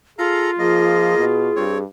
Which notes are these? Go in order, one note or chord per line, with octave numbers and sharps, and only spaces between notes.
F4 G#4 A4 F5 A#5
F3 A#3 G#4 D#5
B2
G2 C4 C#5